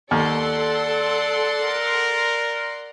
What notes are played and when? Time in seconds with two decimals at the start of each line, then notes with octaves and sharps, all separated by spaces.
0.11 D#2 A4 D5 F#5 C6
1.63 A#4